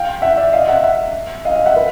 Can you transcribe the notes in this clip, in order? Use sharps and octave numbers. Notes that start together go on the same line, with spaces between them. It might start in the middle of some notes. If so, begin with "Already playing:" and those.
Already playing: F5 G5
E5 F#5
D5 E5
D#5 F5
E5 F#5
E5 F#5
D#5 F5
D#5 F5
E5 F#5
B4